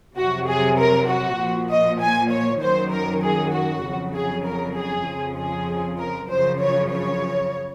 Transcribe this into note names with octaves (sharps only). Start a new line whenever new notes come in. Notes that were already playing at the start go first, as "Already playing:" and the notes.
F2 C3 F#3 F#4
G#4
A#4
F#4
A#2 F3
D#5
G#5
C#5
F#2 D#3 F#3 C5
A#4
G#4
F#4
F2 C#3 F#3
G#4
A#4
G#4
F2 C#3 F3
G#4
A#4
F#2 C#3 F3 C5
C#5
C#5